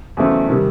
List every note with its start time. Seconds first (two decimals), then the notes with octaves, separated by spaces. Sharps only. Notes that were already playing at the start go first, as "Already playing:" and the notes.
0.17 E2 C#3 F#3 A3 C4
0.49 C3 D#3 G3